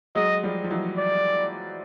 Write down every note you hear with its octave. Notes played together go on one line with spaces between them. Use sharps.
F#3 G#3 D#5
F3 G3
F3
E3 F#3
D5